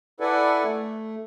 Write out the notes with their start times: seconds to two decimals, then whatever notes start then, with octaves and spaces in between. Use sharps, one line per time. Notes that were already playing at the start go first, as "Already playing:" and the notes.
0.20 E4 A4 B4 D5 F#5 G#5
0.64 A3